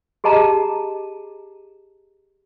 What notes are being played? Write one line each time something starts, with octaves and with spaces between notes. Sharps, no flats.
G4 G#4 D#5 A5 A#5